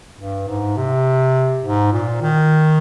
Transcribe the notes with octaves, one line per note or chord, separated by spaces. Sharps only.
G2
G#2
C3
G#2
A#2
D#3